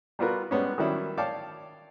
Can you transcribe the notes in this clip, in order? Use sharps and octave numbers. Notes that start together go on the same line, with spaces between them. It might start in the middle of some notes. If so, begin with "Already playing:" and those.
G3 B3 F4 F#4 A#4 B4
G3 G#3 B3 C#4
D#3 F#3 G3 C#4 E4
C#5 D5 F5 G5 A5 D6